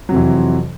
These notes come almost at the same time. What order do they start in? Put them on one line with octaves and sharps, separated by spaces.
F#3 C3 F2 E3